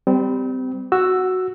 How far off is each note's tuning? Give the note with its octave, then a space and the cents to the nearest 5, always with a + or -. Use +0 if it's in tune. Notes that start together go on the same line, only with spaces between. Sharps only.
G3 +0 C4 -30
F#4 +0 E6 +5